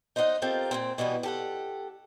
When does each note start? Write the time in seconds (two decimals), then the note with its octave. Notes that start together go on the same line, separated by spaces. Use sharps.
0.16 D#4 C5 D5 D#5 F#5
0.42 C4 F4 G4 A4 A#4
0.71 A#2 D#3 C4
0.98 B2 E3 G3 B3
1.23 G4 A4 F#5